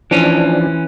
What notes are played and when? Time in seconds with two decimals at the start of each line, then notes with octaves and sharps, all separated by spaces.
0.11 E3 F3 C#4 D4